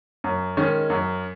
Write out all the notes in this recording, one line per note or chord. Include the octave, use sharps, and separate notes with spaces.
F#2
D#3 G#3 C#4
F#2